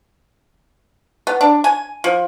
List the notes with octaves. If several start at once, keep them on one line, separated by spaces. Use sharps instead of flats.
B3
D4
G#5
F3